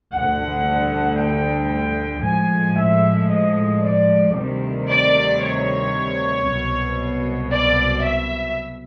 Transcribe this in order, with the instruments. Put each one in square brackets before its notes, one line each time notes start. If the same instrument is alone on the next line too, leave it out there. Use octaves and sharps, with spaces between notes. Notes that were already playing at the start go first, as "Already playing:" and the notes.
[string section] D2 D3 G3 F#5
G5
A2 F3 G#3 G#5
E5
D#5
D5
D2 C3 D#3 G3
D5
C#5
C2 B2 F#3
D5
E5